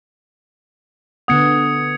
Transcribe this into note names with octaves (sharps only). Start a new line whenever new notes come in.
D3 B3 F#5 D#6 G#6 C#7